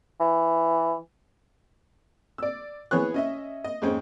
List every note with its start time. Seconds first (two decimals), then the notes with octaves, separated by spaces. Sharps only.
0.20 E3
2.38 D5 E6
2.91 E3 B3 G#4 C#5 C#6 F#6
3.14 C#4 D#5 E5
3.64 D#5
3.82 F2 G#2 G#3 C4 C#4